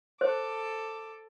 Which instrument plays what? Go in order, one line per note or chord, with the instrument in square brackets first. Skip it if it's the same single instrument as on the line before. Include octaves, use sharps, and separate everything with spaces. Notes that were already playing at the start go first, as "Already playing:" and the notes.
[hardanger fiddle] A4 D6 [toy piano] C5